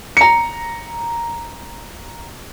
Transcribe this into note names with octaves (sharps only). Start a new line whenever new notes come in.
A#5 C#7